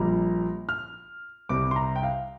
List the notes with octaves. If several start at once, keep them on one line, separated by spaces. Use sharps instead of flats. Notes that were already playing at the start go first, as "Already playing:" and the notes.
Already playing: A#1 A#2 G3 A#5
F6
C2 C3 G3 D6
C6
A#5
G5
F5